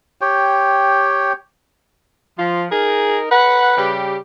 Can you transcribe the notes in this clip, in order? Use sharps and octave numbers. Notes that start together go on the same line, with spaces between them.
G4 C#5 G5
F3 F4
D#4 G#4 A#4
B4 F#5
C#3 G3 G4